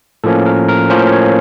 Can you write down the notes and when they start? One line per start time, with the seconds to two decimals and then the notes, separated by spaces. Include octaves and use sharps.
0.24 A2 F3 A#3 C#4 A4
0.46 A#4
0.68 A#4
0.90 A2 F3 A#3 C#4 C5
1.12 C#5